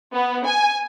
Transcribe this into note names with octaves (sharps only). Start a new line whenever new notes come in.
B3
G#5